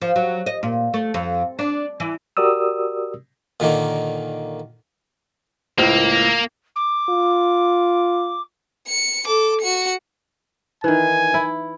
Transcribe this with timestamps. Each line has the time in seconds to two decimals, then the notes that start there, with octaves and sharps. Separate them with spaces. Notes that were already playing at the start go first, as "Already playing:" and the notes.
0.02 F3
0.16 F#3
0.46 D#5
0.63 A#2
0.94 A3
1.14 F2
1.59 D4
2.00 E3
2.37 F#4 G4 A#4 D5 D#6 E6
3.60 A#2 D3 D#3 A#3
5.78 C#2 A2 A#3 C5
6.76 D6
7.10 F4
8.87 C#7
9.26 A4 D6
9.61 F#4 C#7
10.84 D#3 E3 G#5
11.34 E4